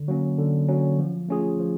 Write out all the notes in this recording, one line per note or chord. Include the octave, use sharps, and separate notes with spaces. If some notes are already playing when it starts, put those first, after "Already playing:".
Already playing: D3
F#3 A#3 C#4
D3
F#3 A#3 C#4
F3
A3 C#4 F4 G#4
F3